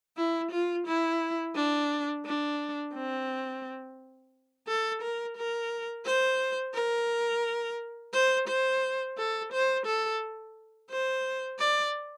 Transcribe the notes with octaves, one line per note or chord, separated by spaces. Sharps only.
E4
F4
E4
D4
D4
C4
A4
A#4
A#4
C5
A#4
C5
C5
A4
C5
A4
C5
D5